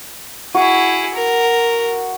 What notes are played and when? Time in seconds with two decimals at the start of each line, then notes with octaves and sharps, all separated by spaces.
0.55 E4 F#4 G#4
1.14 A#4